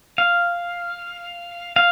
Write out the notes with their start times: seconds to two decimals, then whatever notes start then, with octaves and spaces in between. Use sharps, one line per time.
0.18 F5
1.76 F5